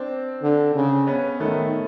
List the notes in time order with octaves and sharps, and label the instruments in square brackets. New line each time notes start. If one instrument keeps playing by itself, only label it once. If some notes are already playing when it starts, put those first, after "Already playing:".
Already playing: [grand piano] C4 D4
[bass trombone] D3
C#3
[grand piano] B3 C#4
[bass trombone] D#3 [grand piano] A3 B3